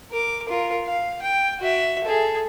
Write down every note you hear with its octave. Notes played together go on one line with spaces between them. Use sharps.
A#4 D6
F4 A#4
F5
G5
F#4 E5
G#4 A4